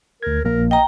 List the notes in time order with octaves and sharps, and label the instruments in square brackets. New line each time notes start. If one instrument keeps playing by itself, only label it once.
[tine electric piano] D2 G#6 [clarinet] A#4
[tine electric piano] A#1 A#3 [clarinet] A#4
[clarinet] D#5 [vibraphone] G5 A#5